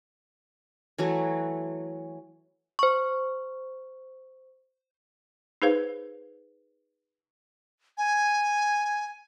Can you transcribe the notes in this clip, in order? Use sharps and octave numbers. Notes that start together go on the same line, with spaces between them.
E3 F#3 A3
C5 C#6
D#4 G#4 B4 C5 F5
G#5